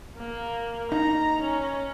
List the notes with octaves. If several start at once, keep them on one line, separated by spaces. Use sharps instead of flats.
A#3
D#4 A#5
C#4